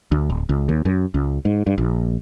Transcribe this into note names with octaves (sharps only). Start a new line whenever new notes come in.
D2
D1
C#2
D#2
F#2
C#2
G#2
G2
A#1